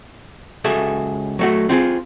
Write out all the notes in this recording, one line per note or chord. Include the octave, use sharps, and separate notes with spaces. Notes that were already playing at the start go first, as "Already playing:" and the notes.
C#2 F#4 G#4 A4 E5
F#3 A3 F#4
C4 F4 G#4